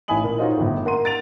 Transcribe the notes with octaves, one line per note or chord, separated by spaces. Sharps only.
A1 E4 G#5 B5 D#6 F#7
A#2
D#4 F4 F#4 C5 C#5 D#5
G1 A2
A#3 F#5 A#5 C6 D#7
A6 D7 F7